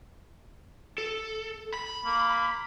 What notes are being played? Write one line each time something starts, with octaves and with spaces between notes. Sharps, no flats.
A4
B5
A#3